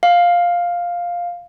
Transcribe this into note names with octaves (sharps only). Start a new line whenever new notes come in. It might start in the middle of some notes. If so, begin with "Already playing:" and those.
F5